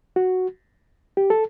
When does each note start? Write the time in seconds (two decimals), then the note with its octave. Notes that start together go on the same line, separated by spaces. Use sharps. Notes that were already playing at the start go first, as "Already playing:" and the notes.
0.16 F#4
1.17 G4
1.30 A4